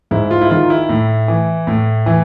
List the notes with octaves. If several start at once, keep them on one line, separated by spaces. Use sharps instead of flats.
G#2 E4
F4
E4
D#3 F4
E4
A2
E3
A2
E3